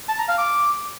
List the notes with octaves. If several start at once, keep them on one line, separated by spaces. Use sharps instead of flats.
A5
A#5
F5
D6